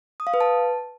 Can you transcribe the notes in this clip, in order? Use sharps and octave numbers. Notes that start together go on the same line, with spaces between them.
D#6
F5
B4
A5